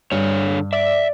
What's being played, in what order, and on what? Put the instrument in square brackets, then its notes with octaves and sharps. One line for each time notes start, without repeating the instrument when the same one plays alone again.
[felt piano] G2 [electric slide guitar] D3 C#5
[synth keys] D5 [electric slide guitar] E5